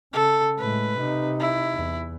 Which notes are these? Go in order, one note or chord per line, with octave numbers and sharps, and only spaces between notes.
C#3 A4
A2 G#3 B4
C3 D#4
E4
E2